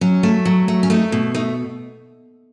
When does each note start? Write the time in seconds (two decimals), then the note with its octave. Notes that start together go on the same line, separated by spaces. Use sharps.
0.01 F#3 C#4
0.23 A3
0.45 F#3
0.68 A3
0.83 C#4
0.90 A3 D#4
1.12 B2
1.35 A3 D#4